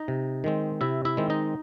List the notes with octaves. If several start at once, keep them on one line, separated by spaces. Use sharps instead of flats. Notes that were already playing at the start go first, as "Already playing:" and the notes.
Already playing: D#4 D#5
C3
D#3 G#3 C4
C3 E4 E5
E4 E5
D#3 G#3 C4
D#4 D#5